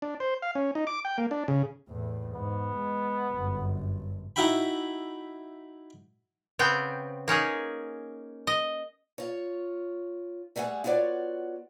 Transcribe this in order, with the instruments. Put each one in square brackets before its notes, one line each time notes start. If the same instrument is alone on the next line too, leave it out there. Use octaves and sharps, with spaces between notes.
[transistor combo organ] D4
C5
F5
C#4
D#4
D6
G5
A#3
D4
C#3
[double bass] E2 A2
[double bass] G#2 [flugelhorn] B3
[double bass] G#3
G1 F#2
[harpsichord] D#4 E4 F#4 E5 G5 B5
[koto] C#3 B3 C4 G5
A#3 C#4 D#4 G#4
D#5
[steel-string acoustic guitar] F4 C#5
G3 A3 G#4 F#5 G#5
B3 F4 F#4 C#5 D5